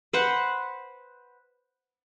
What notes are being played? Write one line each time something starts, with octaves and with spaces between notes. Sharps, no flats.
B4 C5 F#5